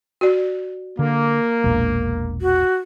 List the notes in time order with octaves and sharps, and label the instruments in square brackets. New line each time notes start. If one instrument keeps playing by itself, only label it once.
[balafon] F#4 D5
[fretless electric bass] D3 [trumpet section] A#3
[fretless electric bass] E1 A#1
[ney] F#4